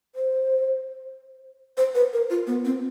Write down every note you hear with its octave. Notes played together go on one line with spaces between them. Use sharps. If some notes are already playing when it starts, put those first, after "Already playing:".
C5
C5
B4
A#4
F4
B3
C4